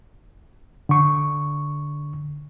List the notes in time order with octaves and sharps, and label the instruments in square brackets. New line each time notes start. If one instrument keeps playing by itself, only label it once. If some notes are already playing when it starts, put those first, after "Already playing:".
[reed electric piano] D3 C#6